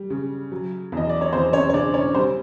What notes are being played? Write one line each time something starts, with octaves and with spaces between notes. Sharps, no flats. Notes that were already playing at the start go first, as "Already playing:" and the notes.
Already playing: G3
C#3
F#3
E2 D#5
D5
C#5
E2 C4 C5
C#4 C#5
C#5
C#3 D4 D5
C#4 C#5
G3 C4 C5